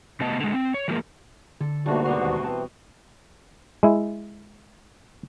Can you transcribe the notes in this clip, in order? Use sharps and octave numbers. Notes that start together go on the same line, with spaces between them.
C3 A3 B3 D#5 A5
D3 G#3
C4
C#5
E3 F3 G#3 A#3 A#4
D3 A4
D2 G#2 B2 G3 A3 A#3 D4 F#4
B2 B3 D4 A#5 C6
D#2
E3 C4 A5
G#3 E4